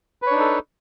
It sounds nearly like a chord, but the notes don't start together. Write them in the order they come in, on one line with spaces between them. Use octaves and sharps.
B4 C#5 D4 D#4 A4